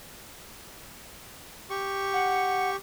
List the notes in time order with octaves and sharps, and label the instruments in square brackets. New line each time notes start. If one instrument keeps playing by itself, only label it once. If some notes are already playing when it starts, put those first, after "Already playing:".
[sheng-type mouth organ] G4 C#6
[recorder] F#5